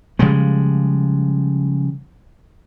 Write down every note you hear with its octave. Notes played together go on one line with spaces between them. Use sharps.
C#3 F3 G3 G#3